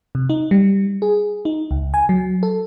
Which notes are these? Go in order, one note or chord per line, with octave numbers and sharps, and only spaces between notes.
C3
D#4
G3
G#4
D#4
C#2
G#5
F#3
A4